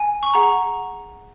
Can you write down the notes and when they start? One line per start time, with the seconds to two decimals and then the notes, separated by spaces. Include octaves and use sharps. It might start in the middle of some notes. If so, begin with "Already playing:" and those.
Already playing: G#5
0.23 C#6
0.34 G#4 F#5 A#5